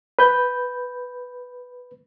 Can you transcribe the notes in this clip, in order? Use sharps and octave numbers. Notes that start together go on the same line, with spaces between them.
B4 G6